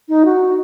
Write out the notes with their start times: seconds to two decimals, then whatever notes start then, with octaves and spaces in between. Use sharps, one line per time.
0.09 D#4
0.25 F#4